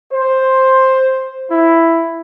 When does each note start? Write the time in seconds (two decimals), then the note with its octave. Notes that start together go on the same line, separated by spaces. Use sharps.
0.12 C5
1.51 E4